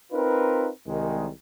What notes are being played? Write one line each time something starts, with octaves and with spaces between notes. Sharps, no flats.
C4 D#4 F4 A#4 B4
C2 D#3 G#3